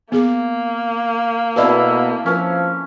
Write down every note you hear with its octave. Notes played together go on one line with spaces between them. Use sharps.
A#3 B3 G#4 D6
B2 C4 E4 A4 B4 D5 D#5
F3 C#4 A#4 B4